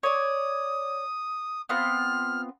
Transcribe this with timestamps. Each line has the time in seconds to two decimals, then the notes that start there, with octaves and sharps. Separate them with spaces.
0.03 C#5 D5 D#6
1.69 B3 C4 F4 F6